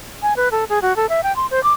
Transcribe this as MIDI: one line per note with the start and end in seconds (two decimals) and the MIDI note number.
0.22 0.36 80
0.36 0.49 71
0.52 0.64 69
0.69 0.79 68
0.82 0.95 66
0.96 1.09 69
1.09 1.21 76
1.23 1.35 79
1.36 1.46 84
1.51 1.62 72
1.63 1.73 86